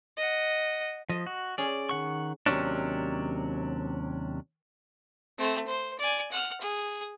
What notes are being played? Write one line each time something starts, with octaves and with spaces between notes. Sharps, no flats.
D#5 F#5
F3 D#5
F#4
C#4 G#4 D5
D#3 F#5 C#6
D#2 C3 D#3 F#3 C#4 D4
A3 C4
C5
D5 G#5
F#5 F6
G#4